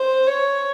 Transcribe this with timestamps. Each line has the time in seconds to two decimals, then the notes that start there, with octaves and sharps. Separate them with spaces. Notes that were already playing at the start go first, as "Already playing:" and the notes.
Already playing: C5
0.27 C#5